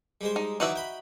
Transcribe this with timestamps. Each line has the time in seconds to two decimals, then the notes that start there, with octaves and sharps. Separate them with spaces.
0.21 G3 G#3 C5
0.36 D#4
0.60 E3 F#3 D#4 F#4 D5 E5
0.76 G5 B5